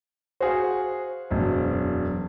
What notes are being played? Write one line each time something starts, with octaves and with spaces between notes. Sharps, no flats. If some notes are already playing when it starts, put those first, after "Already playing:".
F#4 G#4 C5 F5 F#5
E1 F#2